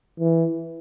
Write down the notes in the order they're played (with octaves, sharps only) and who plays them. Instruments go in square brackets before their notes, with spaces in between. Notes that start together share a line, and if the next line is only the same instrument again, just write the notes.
[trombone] E3